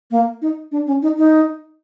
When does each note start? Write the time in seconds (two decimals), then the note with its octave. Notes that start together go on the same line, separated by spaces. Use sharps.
0.11 A#3
0.42 D#4
0.72 D4
0.87 C#4
1.02 D#4
1.18 D#4